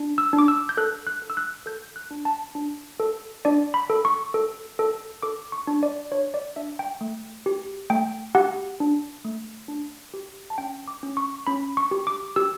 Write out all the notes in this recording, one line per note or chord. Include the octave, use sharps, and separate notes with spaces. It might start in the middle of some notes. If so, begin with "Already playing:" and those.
Already playing: D4
E6
D4
D6
E6
G6
A4 F#6
F#6
A4
E6
F#6
A4 G6
F#6
D4
A5
D4
A4
D4 D5
B5
A4
C#6
A4
A4
A4 D6
C#6
D4
D5
D4 C#5
D5
D4 E5
G5
A3
G4
A3 G5
G4 F#5
D4
A3
D4
G4
A5
C#4 G5
D6
C#4
C#6
C#4 B5
C#6
G4
D6
G4 E6